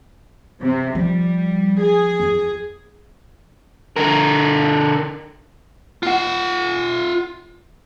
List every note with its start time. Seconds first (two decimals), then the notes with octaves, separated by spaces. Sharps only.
0.61 C3
0.95 F3 G3
1.82 G#4
2.20 F2
3.96 D3 A#4
6.03 F4 F#5